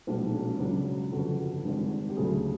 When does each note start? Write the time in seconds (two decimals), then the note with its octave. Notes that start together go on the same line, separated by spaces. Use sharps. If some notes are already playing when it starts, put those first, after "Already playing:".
0.07 B1 A#2 F3 G#3 D4
0.20 D#4
0.33 D4
0.46 C#4
0.59 C#2 C#3 F#3 D4
1.12 G1 F2 C#3 F#4
1.64 G#1 G2 D#3 G#3
2.09 G4
2.16 D2 C#3 F#3 A3 G#4